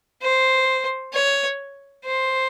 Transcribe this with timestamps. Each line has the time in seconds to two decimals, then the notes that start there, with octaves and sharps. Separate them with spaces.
0.22 C5
1.14 C#5
2.05 C5